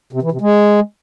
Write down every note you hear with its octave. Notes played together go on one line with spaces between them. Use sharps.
C3
E3
C3
G#3